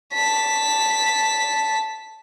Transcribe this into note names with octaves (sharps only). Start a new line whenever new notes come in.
A5 B6